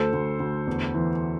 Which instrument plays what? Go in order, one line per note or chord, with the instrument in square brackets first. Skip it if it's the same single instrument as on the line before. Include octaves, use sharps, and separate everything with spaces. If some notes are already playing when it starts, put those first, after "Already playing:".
Already playing: [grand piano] D2 [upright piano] A4 C5
[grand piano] D2
D2
E2
E3